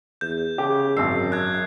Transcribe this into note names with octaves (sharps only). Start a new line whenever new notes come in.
E2 G6
C#3 G4
G#1 F#2 E6 C7
F#6 G#6